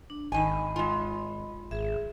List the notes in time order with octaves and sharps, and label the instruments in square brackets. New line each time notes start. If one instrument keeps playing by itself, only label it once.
[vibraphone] D4
[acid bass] G#1 [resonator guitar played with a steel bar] D#3 G#5 [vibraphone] D#5 B5
[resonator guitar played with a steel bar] G#3 F4
[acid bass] G#1 [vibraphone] G#4 E5